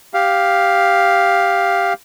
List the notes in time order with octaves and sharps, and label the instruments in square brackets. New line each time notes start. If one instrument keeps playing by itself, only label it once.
[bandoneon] G4 F5